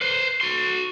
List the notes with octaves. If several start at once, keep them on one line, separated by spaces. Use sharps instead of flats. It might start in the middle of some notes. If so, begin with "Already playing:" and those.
B4 C5
F#4 C6